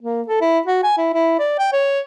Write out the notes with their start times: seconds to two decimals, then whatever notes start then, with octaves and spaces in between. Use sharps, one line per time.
0.01 A#3
0.28 A4
0.41 E4
0.66 F#4
0.84 G#5
0.97 E4
1.13 E4
1.39 D5
1.59 G5
1.72 C#5